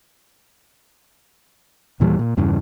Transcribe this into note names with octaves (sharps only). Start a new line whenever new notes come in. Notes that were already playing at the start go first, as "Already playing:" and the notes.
D#2 A#2 E3 G3
A#2
E2 G2 C#3 E3